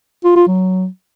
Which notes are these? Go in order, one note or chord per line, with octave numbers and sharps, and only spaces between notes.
F4
F4
F#3